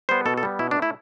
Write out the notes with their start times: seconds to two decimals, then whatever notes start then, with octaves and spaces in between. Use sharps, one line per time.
0.09 G3 B3 C5
0.26 B2 A4
0.38 A4
0.43 G3 B3
0.59 B2 E4
0.71 D4
0.77 A3
0.82 E4